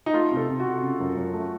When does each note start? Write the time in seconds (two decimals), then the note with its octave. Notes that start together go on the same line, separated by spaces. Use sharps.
0.06 D#4
0.13 A3 F4
0.31 C3
0.37 A4
0.49 C3
0.60 F#4
0.66 C3
0.82 C#3
1.00 F#2
1.17 F#2
1.33 A3